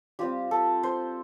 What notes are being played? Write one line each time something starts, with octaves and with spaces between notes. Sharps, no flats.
G3 C4 F4 G4
A4
C5